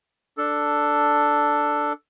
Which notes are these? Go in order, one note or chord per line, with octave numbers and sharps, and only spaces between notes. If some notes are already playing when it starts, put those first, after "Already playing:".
D4 A4